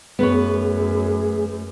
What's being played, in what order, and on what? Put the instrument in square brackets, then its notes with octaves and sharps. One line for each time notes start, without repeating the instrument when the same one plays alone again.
[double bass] F#2 [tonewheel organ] A3 G#4 [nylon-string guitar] B3 B4 C#5